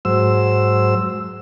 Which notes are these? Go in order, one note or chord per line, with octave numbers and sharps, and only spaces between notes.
G#2 F#3 C5 E6